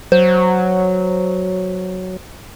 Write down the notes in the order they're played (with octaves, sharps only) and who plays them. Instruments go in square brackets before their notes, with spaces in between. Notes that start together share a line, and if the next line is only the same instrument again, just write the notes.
[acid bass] F#3 [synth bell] C5